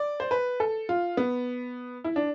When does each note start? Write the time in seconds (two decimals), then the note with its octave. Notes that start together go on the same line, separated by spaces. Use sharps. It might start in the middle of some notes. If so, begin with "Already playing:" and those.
Already playing: D5
0.20 C5
0.31 B4
0.60 A4
0.89 F4
1.17 B3
2.04 E4
2.16 D4